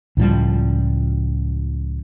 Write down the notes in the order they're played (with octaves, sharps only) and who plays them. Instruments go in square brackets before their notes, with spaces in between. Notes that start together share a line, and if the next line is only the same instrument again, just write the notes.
[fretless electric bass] C#2 A2 F3 G3